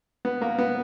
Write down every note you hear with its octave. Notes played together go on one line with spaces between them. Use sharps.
B3
A#3
B3